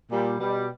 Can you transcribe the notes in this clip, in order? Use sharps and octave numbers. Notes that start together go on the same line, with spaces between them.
A#2 G3
B2 G3